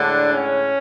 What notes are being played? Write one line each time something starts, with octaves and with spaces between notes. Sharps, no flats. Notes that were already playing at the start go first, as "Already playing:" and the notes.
Already playing: A2 D3 G#3 D4
C#4